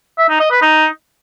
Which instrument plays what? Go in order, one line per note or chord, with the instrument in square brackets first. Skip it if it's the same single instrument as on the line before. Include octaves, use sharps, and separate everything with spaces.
[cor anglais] E5
D#4
D#5
B4
D#4